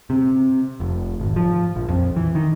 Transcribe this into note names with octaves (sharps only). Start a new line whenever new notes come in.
C3
F1
G#1
F3
A#1
F2
E3
D#3